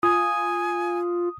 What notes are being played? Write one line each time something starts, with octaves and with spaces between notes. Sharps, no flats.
F4 G#5 D#6